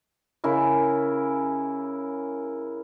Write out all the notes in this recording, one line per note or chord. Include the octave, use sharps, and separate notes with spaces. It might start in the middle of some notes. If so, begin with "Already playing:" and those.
C#3 E4 A#4